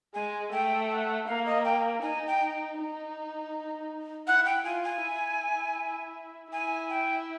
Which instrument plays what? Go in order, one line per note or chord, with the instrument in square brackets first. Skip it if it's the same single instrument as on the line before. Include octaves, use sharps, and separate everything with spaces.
[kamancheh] G#3 [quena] G#5
[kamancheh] A3 [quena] G5
[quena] G5
F#5
[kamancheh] A#3 [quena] F5
[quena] D#5
G5
[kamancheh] D#4 [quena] G#5
[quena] G5
[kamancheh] D#4
[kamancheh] E4 [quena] F#5
[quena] G5
[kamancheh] F4 [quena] G#5
[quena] G#5
[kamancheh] E4
[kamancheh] E4 [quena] G#5
[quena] G5